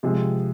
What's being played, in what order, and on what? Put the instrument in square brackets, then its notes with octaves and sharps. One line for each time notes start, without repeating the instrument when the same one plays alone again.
[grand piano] C3 F3 G#3 C4